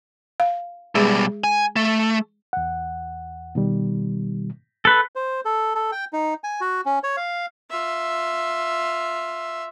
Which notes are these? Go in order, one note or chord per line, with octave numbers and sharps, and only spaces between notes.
F5
B2 G3 G#3 G#4
G#5
A3
E2 F#5
B2 D#3 G3
A4 B4
C5
A4
A4
G5
D#4
G#5
F#4
C#4
C#5
F5
F4 E5